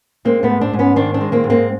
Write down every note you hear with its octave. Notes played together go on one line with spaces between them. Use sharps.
G#3 A#3 C4
A3 B3
G#2
C4 D4
G#2
B3 C#4
D#3 C4 D4
C4 D4
G#3
A#3 C4
G#2
A#3 C4